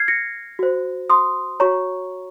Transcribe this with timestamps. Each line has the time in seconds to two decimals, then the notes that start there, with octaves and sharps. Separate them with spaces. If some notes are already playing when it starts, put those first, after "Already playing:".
Already playing: F6 G#6 C7
0.08 A#6 C#7
0.59 F#4 C5
1.10 C6 D#6
1.60 F#4 C#5 A#5 C#6